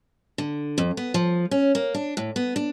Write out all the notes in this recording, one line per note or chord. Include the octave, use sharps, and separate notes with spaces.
D3
F2
B3
F3
C#4
A#3
D4
A2
B3
D4